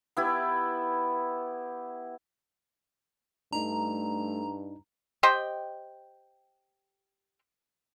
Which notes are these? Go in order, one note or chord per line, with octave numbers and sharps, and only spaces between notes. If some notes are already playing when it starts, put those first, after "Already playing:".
B3 E4 G4
G2 A3 D4 D#4 A#5
G4 C5 D#5 G5